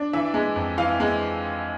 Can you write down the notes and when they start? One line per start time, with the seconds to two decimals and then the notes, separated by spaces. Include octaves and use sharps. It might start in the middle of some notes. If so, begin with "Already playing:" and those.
Already playing: D4
0.13 E3 E5
0.34 G#3
0.56 F2
0.78 E3 F5
1.00 G#3